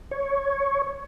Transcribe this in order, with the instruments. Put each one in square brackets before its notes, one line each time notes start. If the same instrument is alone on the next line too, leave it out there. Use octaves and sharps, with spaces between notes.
[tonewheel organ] C#5